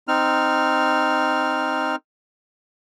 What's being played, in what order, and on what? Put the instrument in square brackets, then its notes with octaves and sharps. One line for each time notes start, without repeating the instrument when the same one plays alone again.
[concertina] C4 D#4 F6